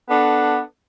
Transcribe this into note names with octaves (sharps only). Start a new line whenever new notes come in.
B3 D4 A4